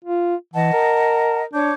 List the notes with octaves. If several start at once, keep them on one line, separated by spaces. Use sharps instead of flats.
F4
E3 D#5 F#5 A5
A#4
D4 C#5 D6 G6